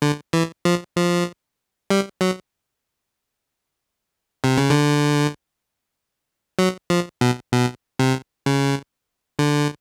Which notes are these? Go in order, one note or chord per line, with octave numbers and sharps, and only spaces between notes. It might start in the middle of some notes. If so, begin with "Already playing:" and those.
D3
E3
F3
F3
G3
F#3
C3
C#3
D3
F#3
F3
B2
B2
C3
C#3
D3